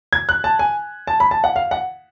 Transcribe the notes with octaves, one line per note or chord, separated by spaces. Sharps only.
G#6
F#6
A5
G#5
A5
B5
A5
F#5
F5
F#5